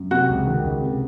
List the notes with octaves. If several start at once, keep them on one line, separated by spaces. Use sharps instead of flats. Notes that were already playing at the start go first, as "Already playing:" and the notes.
Already playing: F#2
C3 F#4
C#2
D#3
C#2
C3